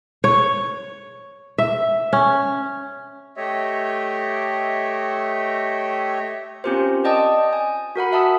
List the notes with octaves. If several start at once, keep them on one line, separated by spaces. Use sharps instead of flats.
C#5
E5
C#4
A3 G4 C#5 D#5 E5
C4 C#4 F4 G4 A#4 C5
D5 D#5 G5 A5 D#6
G#5
F#4 A#4 F#5 B5
E5 F#5 A5 D#6 E6